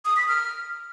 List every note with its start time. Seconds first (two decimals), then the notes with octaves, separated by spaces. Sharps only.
0.05 D#6
0.17 B6
0.28 F6